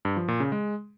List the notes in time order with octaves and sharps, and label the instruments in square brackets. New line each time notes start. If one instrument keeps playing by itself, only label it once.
[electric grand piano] G2
F3
A#2
C#3
G#3